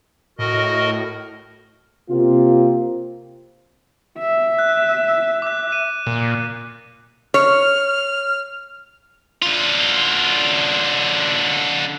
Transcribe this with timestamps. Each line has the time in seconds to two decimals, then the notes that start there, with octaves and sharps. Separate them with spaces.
0.39 A2 F#4 A#4 D#5
2.10 C3 A#3 C4 F4
4.19 E5
4.59 F#6
5.42 D6 F#6
5.72 D#7
6.07 A#2
7.34 C#5 F6
9.42 D3 F4